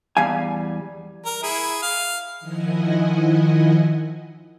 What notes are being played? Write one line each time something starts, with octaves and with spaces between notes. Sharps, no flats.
E2 G3 F5 G#5
A#4
E4 G#4
F5
D#3 F3 E4 D#5 F#5 G#5